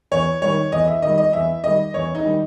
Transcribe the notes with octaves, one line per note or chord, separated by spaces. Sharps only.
E2 C#5
D#3 G3 C#5
E2 D#5
E5
D#3 G3 D#5
D#5
E2 E5
D#3 G3 D#5
E2 C#5
D#4
D#3 G3